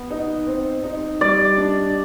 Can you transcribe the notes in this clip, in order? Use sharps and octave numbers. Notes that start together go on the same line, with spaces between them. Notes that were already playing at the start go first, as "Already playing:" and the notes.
Already playing: B3
D#4
C4
D#4
G3 D5
D4